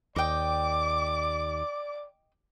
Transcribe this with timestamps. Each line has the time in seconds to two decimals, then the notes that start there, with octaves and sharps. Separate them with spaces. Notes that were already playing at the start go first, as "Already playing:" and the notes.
0.16 D#2 D5 D#5 G5 D6